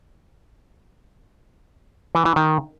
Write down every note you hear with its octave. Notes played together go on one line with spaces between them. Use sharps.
E3
E3
D#3